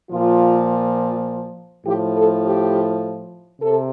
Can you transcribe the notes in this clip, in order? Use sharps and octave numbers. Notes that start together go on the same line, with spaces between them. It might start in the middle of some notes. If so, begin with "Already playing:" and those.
A#2 F3 F4
A2 F3 G4
A4
G4
C3 A4